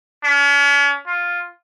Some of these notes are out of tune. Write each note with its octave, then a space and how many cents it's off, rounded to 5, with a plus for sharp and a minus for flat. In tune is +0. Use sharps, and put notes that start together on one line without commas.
C#4 +40
F4 +5